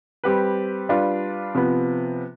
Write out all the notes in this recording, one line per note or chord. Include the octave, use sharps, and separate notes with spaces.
G3 C4 G4 B4
G3 D4 F4 B4
C3 F3 B3